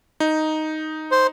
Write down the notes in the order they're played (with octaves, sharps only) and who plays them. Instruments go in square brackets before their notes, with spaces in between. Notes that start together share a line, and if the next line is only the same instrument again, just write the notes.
[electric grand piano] D#4
[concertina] C5